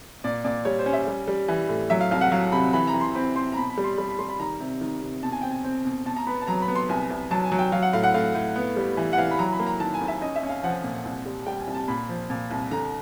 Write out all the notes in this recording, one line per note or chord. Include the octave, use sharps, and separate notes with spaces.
A#2 D5
A#2 D5
G3 C#5
C5
C#4
E5
G3
G3
E3
A2
F#3 E5
F5
C2 F5
F#5
F#3 F5
C3 B5
E3 B5
A#5
E3
C6
C4 B5
C4 C6
A#5
B2 B5
B5
G3
C6
G3 B5
B5
G3 C6
B5
D#3 A#5
C3
D#3
C3
B2 A5
G#5
C4 G5
G#5
C4
B2
B2 A5
A#5
B3 B5
A5
F#3 A#5
B5
B3
C6
C2 G#5
C2
F#3 A5
G#5
F#3
G5
F#3 F5
F#5
A2 F5
F#5
A2 F5
A2
B3
G3
E3
F#5
E3 F5
B5
F#3 A#5
B5
A#3
A#5
D#3 A5
G#5
D#2
E5
C#4 D#5
E5
C#4
F5
F3 F#5
A#2
C2
G3
G3 G5
G#5
C2
A5
A#2 B5
F3
A#2
C2
D3 A#5